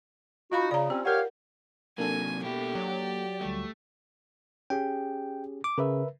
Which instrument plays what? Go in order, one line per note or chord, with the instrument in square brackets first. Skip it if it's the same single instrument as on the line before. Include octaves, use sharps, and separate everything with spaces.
[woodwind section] D#4 F#4 [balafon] F4 F5 B5
[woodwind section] C#3 [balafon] D5 A#5
[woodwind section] C4 C#4 [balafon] G4
[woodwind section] G4 C#5 F5 [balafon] A#4 F#5
[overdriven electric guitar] C3 F#3 [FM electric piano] A#3 D4 A4 [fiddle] G#5
[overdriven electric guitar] B2 E4 [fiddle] G4
[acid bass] F#3 [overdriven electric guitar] D5
[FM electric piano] D2 G3 [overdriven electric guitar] A3
[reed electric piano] C#4 G4 G#4 [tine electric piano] G5
[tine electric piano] D6
[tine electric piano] C#3 [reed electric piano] A#4 B4 E5